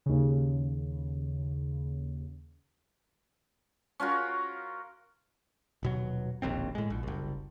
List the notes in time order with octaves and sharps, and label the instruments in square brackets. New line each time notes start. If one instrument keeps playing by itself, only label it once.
[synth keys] D#2 C#3
[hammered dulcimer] C#4 F4 F#4 A#4
[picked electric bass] D#1 B2 F#3
E1 A#1 D#2 C4
A2 G#3
A#1
F#1 C2